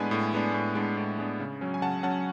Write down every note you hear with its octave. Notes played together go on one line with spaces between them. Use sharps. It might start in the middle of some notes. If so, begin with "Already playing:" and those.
Already playing: A2 G#3 B3 D4 G#5 B5
A2
G#3 B3 D4
A2
G#3 B3 D4
A2
G#3 B3 D4
C#3
F#3 C#4
G#5
C#3 F#5 A5
F#3 C#4 F#5 A5